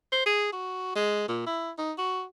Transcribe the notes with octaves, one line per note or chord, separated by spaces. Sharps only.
C5
G#4
F#4
G#3
A#2
E4
D#4
F#4